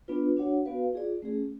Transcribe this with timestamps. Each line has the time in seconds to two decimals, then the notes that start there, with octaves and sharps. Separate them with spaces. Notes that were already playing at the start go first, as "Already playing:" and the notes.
0.08 B3 D4 F4 B4
0.37 D4 F#4 C#5 F#5
0.65 B3 F#4 B4 F5
0.93 F4 G#4 D5
1.22 A3 C#4 G#4